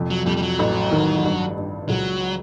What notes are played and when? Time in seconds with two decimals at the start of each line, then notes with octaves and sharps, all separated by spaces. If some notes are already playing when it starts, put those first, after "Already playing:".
Already playing: C2 F2
0.10 F#3
0.26 F2 G3
0.37 G3
0.42 F#3
0.59 A1
0.91 D#3
1.24 G2
1.57 G2
1.89 C#2 F#3